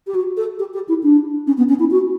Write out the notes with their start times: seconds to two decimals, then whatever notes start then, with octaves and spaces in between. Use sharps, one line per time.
0.06 G4
0.14 F#4
0.36 A4
0.59 G4
0.73 G4
0.88 E4
1.03 D4
1.46 C#4
1.57 B3
1.68 C#4
1.79 E4
1.90 F#4